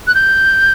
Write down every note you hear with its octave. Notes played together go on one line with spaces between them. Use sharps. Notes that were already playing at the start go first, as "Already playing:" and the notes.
F#6
G6